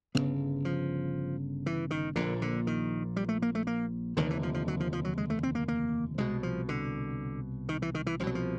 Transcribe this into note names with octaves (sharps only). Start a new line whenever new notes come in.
G1 F2 C#3 B3
F3
E3
D#3
A#1 A#2 D3
D3
D#3
G3
A3
A#3
A3
A#3
F1 D#2 D3 D#3
E3
F3
F3
F#3
F3
F3
F#3
G#3
A3
C4
A#3
A#3
C2 B2 G#3
F3
D3
D#3
E3
D#3
E3
C2 B2 F3 F#3
F3